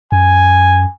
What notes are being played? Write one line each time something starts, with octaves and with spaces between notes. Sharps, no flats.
F#2 G#5